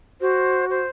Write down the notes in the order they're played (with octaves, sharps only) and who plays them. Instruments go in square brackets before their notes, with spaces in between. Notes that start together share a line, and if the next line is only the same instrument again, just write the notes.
[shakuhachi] F#4 [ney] C5
[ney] C5